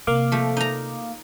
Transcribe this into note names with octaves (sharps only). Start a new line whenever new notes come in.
C3 A#3 F5 D6
F3 A3
D#4 A#5